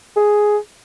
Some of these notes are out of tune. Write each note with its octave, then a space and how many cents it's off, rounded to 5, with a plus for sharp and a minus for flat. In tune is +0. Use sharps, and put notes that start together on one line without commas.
G#4 +5